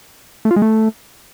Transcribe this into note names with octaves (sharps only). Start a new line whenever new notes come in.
A3
F4
G#3
A3